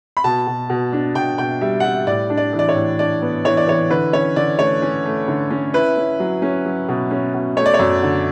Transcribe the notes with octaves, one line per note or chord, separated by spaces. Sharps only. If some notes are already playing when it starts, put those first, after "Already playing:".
B5
B2 A5
B2
B2
D4
B2 G5
B2 G5
G3 E5
F#5
G3 E5
A2 D5
D4
D5
E3
D5
C#5
A2
D4 D5
B3
E3 C#5
D5
E3 C#5
D3 B4
C#4 C#5
D3 D5
A3 C#5
C#4
A3
D3
C#4
E4 B4
C#4
F#3
C#4
F#3
B2
C#4
B2
A3 C#5
D5
C#5
F#2
D3